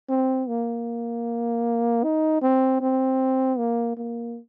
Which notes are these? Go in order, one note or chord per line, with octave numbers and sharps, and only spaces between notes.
C4
A#3
D#4
C4
C4
A#3
A#3